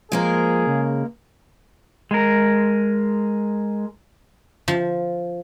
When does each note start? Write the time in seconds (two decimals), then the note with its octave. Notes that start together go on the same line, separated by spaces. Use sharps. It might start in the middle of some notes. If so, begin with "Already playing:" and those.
0.12 F3 G#3 A#3 G#4 A#4
0.67 C#3
2.11 G#3 A#4
4.68 F3